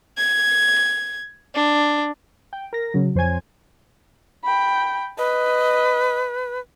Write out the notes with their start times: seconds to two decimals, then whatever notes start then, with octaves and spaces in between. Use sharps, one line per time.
0.16 G#6
1.54 D4
2.53 G5
2.73 A#4 A#6
2.94 C#3 F#3
3.15 F2 C5 C#5 G#5 G#6
4.44 G5 B5
5.18 B4 D#5